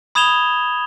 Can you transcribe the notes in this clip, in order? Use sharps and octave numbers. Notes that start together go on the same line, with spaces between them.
B5 D#6 G#6 E7 F7 G7